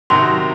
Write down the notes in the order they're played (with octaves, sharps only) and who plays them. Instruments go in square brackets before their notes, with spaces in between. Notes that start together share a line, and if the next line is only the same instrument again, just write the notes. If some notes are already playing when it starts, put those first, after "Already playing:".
[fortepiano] C3 D#3 F#3 [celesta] C6